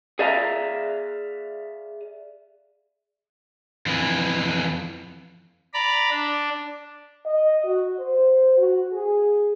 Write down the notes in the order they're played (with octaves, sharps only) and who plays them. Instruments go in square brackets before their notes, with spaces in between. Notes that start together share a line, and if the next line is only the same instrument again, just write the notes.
[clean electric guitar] G#4 D5 E5 F5 A5 A#5
[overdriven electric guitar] F2 E3
[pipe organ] D5 A#5 B5
D4
[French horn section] D#5
F#4
C5
F#4
G#4